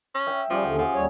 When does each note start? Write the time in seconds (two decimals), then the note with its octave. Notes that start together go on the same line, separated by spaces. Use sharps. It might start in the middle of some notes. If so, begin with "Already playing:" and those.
0.15 C#4
0.27 E5 G5
0.50 F3 G3 C#4 G4 G#4
0.63 D#2 D3 F#5
0.78 F3
0.94 D#2 G3 C#5